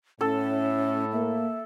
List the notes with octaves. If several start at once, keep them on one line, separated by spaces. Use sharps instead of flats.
A2 C#4 A4
A#3 E5